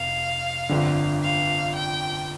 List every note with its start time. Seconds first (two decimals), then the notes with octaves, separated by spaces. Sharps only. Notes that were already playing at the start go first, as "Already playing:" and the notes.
Already playing: F1 F5
0.69 G1 F2 D3
1.23 F5
1.75 G5